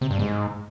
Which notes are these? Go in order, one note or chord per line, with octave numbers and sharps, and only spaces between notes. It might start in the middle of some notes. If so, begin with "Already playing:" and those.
C3
G2
G#2